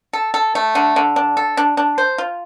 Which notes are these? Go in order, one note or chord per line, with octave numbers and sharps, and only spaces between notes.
A4
A4
A3
D3
D3
D4
A4
D4
D4
C5
F4